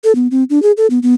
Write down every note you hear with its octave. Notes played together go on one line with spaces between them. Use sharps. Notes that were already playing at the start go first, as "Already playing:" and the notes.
A4
B3
C4
D4
G#4
A4
B3
B3